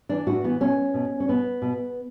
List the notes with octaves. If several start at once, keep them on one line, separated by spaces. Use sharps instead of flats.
E3 D4
A2 F#4
E3 B3
B2 C#4
B2
C#4
B2 B3
B2